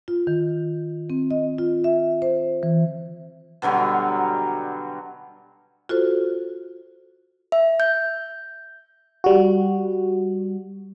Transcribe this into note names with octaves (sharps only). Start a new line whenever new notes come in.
F4
D#3
C4
D#5
F4
E5
C5
E3
B2 D3 F#3 G3
F4 F#4 A4 C5
E5
G6
G3 F#4